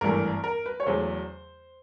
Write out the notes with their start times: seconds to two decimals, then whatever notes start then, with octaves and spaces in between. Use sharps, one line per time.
0.01 G#1 G2 E3 A3 A#4
0.44 A#4
0.66 B4
0.80 C#5
0.86 E2 C#3 F#3 A3 C5